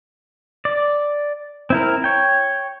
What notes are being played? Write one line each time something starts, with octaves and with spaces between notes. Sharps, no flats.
D5
C4 E4 A#4
C#5 G5